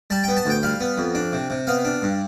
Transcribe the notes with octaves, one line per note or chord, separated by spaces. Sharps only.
G3 A5
B3 G5
A5
D2 G5
G3 F5
B3
F2
D4
C3
C3
B3 F5
D4
G2